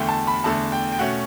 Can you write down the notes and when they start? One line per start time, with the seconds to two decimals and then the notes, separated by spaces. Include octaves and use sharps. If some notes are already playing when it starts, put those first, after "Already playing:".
Already playing: E2 D3 A3 G5
0.09 A5
0.27 B5
0.44 E2 D3 A3 A5
0.72 G5
0.92 G5
0.99 B2 A3 C#4 F#5